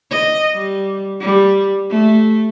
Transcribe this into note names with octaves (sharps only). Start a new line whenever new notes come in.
D#5
G3
G3
A3